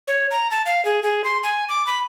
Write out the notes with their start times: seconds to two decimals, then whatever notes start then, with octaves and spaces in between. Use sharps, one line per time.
0.08 C#5
0.31 A#5
0.51 A5
0.66 F5
0.85 G#4
1.03 G#4
1.24 C6
1.43 G#5
1.69 D6
1.87 B5